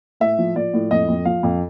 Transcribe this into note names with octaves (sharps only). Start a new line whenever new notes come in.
A2 E5
F3
F3 D5
A2
F2 D#5
F2
F3 F5
F2